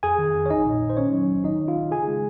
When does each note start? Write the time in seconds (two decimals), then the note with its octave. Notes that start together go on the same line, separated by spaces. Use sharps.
0.03 F2 G#4 G#5
0.19 D#3
0.35 F2
0.46 C#5
0.50 A#1 D#4 D#5
0.66 A#2
0.82 A#1
0.90 C5
0.97 D#3 C#4 C#5
1.12 F#3
1.29 C#2
1.44 D#3 D#4 D#5
1.60 D#3
1.68 F4 F5
1.76 G#1
1.91 C#3 G#4 G#5
2.07 G#3